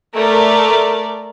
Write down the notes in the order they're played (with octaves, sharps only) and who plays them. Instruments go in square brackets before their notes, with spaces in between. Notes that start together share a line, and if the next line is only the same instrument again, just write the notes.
[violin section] A3 A#4 D5